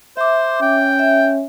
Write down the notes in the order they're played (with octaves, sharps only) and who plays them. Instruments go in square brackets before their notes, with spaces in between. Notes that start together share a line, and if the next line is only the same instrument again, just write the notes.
[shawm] C5 [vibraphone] E5 D6
[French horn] C#4 [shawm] G5
[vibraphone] E5